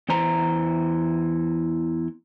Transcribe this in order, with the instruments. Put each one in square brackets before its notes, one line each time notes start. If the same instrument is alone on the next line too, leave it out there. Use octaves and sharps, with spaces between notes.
[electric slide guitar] E2 E3 C5 A#5